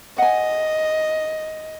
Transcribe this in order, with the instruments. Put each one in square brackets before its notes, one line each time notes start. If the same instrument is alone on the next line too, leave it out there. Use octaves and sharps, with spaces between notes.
[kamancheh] D#5 [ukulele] F#5 G#5